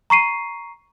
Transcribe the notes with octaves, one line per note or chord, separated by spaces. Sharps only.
A#5 C#6 C7 D#7